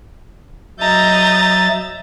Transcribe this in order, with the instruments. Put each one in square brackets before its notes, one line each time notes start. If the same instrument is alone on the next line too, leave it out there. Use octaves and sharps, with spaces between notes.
[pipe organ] F#3 E5 A6 [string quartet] D#5 A#5 G6